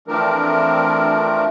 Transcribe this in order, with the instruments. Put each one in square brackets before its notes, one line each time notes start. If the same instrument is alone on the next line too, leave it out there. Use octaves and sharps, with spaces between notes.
[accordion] E3 F3 A3 C4 D4 A#4